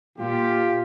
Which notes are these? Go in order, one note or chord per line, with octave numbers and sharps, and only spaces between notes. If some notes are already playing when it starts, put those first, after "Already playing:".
A#2 F4 G4